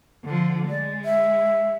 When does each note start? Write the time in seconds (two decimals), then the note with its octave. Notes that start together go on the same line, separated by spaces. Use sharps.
0.24 D3 F3
0.69 G#3 D5
1.05 E5